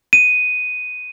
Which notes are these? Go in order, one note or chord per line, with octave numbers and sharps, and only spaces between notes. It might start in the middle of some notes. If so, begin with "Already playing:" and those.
D#7